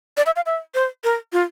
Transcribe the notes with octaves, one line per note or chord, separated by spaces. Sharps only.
D5
E5
F5
E5
C5
A#4
F4